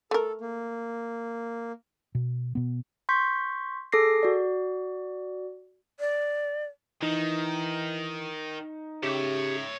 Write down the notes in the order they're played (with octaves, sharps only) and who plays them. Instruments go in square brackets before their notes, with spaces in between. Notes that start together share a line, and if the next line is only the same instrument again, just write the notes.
[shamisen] A3 A#4 [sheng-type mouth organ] A4
[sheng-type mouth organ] A#3
[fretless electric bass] B2
B2 B3
[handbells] C6 C#6 G6 B6
G#4 A4 D6 A#6 C7
F#4 D5
[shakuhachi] D5
[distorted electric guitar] D#3 [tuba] E3 [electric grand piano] D#4
[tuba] C#3 [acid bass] G4 [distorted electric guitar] C#5 E5